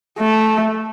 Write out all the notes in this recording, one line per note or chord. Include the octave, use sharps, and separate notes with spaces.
A3